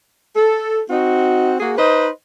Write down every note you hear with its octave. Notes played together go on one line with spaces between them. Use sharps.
A4
C4 D#4 F#4
A#3 F#4 G#4
D#4 B4 C5 D#5